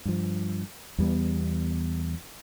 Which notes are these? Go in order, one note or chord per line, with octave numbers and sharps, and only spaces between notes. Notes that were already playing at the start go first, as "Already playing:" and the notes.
G2 F3
E2 G3 B3